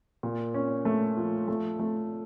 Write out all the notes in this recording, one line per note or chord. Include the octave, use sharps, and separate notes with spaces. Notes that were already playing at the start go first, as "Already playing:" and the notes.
A#2
C#4
A3
F3
A3
A3